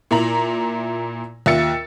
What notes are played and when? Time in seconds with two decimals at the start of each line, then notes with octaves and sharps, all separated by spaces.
0.11 A#2 E4 A#5 F#7
1.46 D#2 F4 E5 E6 A6 C#7